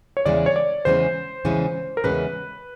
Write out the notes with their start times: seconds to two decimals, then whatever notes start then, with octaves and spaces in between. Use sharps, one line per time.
0.17 C#5
0.26 E2 C#3 E3 G#3 C#4 D5
0.46 C#5
0.56 D5
0.85 E2 C#3 E3 G#3 C#4 C5
1.45 E2 C#3 E3 G#3 C#4
1.97 A#4
2.04 E2 C#3 E3 G#3 C#4 B4